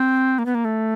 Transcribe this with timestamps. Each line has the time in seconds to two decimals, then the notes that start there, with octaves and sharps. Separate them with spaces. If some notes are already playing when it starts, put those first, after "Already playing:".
Already playing: C4
0.39 A#3
0.46 B3
0.55 A#3
0.65 A3